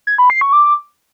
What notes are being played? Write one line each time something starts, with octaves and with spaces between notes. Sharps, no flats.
G#6
B5
C7
C#6
D6